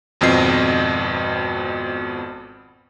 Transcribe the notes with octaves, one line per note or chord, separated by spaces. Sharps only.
G#1 F2 B2 C4 D#5 C7